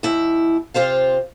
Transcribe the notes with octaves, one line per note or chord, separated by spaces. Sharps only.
D#2 E4
C3 F4 C5 F5